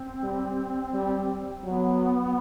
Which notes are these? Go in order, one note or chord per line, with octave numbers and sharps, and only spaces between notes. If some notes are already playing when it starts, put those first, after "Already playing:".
Already playing: C4
G3
G3
F#3 B3